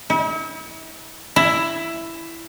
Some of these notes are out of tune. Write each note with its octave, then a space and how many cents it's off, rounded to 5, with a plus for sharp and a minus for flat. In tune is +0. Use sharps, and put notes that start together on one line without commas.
E4 -40
E4 +10